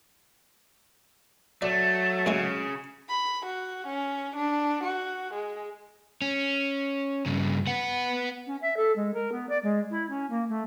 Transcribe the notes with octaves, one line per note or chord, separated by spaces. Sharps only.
F#3 A3 D5
A2 C#3 G#3 A3
B5
F#4
C#4
D4
F#4
G#3
C#4
G2 C#3
B3 F#5
C#4
E5
A4
G#3
A#4
B3
D5
G#3
E4
C#4
A#3
A3